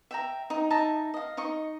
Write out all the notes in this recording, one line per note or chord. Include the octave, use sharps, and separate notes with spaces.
E5 G5 A#5
D#4
D#4 E5 A5 A#5
D#5 F5
D#4 D#5 C#6